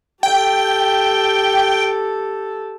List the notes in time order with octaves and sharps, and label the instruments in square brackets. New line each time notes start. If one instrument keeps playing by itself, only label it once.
[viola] G4 A4 [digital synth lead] G5